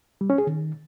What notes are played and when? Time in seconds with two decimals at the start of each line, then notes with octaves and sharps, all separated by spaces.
0.21 G3
0.30 C#4
0.38 G#4
0.47 D#3